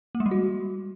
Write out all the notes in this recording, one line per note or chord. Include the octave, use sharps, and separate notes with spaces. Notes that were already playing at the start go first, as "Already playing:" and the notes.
A#3
G#3
G3
F#4